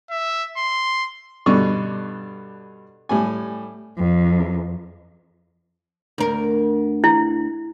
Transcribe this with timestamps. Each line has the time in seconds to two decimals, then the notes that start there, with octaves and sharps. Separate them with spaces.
0.11 E5
0.57 C6
1.46 G2 B2 D3 D4 C#6
3.09 A2 G3 G#5
3.98 F2
6.18 D2 A#4
7.04 E4